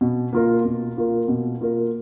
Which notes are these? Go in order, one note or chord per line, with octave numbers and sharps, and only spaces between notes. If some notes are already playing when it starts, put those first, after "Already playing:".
B2
A#3 F4 A#4
B2
A#3 F4 A#4
B2
A#3 F4 A#4